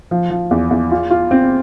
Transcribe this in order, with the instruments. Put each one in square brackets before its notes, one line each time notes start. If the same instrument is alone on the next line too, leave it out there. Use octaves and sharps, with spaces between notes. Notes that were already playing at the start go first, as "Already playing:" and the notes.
[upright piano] F3
F3
E2
E2
F4
F4
C4